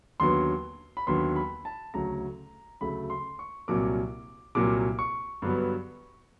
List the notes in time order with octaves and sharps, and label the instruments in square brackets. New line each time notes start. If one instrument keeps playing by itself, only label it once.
[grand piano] D#2 D3 F#3 B3 C6
B5
D#2 D3 F#3 B3 C6
B5
A5
D2 C#3 F#3 A3 A#5
D2 C#3 F#3 A3 B5
C6
C#6
C2 A#2 F#3 A#3 D6
C2 A#2 F#3 A#3 D6
C#6
G2 D3 F#3 B3